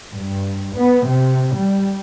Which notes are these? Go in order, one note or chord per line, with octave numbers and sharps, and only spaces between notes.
G2
B3
C3
G3